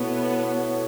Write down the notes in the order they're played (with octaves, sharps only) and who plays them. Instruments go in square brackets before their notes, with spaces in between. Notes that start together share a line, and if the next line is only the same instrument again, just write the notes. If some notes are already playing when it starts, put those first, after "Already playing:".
Already playing: [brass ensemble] B2 A3 E4 A4 C#5 [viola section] B3